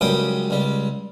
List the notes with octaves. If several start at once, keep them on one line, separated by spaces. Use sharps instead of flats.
C#2 F#2 G3 G5 D#6
C#2 G3